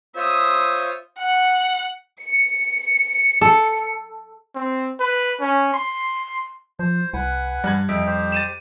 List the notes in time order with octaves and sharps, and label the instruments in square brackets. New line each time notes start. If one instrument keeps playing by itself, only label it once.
[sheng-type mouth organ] F4 C5 C#5 [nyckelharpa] E5 D#6
[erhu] F#5
[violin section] C#7
[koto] A4
[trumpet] C4
B4
C#4
C6
[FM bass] F3 [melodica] C5
[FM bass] C2 [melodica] B4 F#5 G#5
[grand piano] G2 F#6 G#6 [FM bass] G3
[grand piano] F2 [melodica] E5 G5
[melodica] G4 C5
[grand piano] A6 D#7 E7